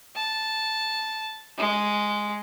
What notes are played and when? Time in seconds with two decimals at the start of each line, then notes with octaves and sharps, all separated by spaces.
0.16 A5
1.58 G#3